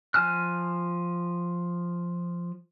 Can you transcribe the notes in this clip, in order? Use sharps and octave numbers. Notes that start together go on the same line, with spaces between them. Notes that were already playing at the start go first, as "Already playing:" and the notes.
F3 G#5 A5 F6 F#6